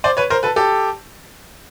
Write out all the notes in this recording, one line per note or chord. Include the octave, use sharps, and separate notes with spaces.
C5 D5
B4 C#5
A#4 C5
A4 B4
G4 A4